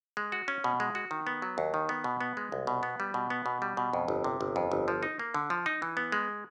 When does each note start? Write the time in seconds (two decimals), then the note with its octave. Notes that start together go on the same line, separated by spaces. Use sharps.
0.17 G#3
0.32 F#4
0.48 C#4
0.64 B2
0.80 G#3
0.95 F#4
1.11 D#3
1.27 B3
1.42 F#3
1.58 D#2
1.74 D#3
1.89 B3
2.04 B2
2.21 B3
2.37 G#3
2.52 C2
2.67 B2
2.83 B3
3.00 G3
3.14 B2
3.30 B3
3.46 B2
3.62 G3
3.77 B2
3.93 F2
4.08 G1
4.24 C3
4.41 G1
4.56 F2
4.72 G1
4.88 F3
5.03 D#4
5.19 A#3
5.34 D3
5.50 F3
5.66 D#4
5.82 E3
5.97 B3
6.12 G#3